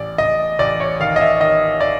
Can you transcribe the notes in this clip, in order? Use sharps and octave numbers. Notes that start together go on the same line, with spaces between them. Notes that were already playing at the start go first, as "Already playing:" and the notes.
Already playing: A1 D5
A1 D#5
A1 D5
C#5
D#3 F5
D#5
E5
D#3 D#5
D5